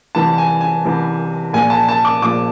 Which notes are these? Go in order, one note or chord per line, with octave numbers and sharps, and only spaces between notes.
C2 C3 E3 A5
G#5
G#5
C2 C3 E3
A#1 A#2 F3 G#5
A5
A5
D6
A#1 A#2 F3 D6